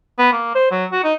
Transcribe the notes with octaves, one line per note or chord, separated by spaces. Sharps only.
B3
A#3
C5
F#3
F#4
D#4